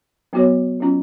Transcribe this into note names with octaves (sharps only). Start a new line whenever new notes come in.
F#3 B3 F#4 C#5
F#3 C#4 F4